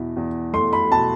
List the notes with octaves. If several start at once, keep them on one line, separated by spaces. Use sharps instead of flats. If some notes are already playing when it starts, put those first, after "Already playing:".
Already playing: E2 B2 E4
E2
A3 C6
B5
B2 A5